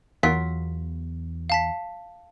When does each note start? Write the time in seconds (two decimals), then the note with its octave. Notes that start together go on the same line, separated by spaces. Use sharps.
0.23 E2 F#3 F4 A#4 B6
1.50 F5 A5 B6